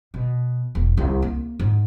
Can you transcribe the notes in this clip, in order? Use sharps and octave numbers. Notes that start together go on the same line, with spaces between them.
B2
E1
C2
A#3
G#2